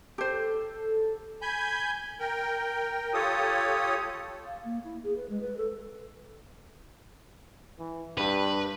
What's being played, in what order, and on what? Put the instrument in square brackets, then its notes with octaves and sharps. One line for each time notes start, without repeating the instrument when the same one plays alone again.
[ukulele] G4 C5 [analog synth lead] A4
[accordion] G#5 B5 G6
A#4 G5
F4 G4 A4 C#5 D#6
[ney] F5
A#3
E4
G#4
B4
G#3
B4
A4
[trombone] E3
[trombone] G2 [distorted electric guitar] B4